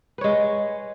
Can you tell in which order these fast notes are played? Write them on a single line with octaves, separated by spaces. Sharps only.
B4 C#5 G#3